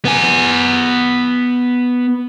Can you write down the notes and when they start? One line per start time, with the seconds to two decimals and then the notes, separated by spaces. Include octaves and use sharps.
0.05 B3 G#5